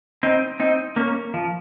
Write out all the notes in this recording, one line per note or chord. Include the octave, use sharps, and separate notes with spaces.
C4 D#4
C4 D#4
A#3 C#4
F3